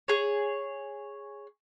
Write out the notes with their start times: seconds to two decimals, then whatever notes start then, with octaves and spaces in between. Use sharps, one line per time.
0.08 G#4 C#5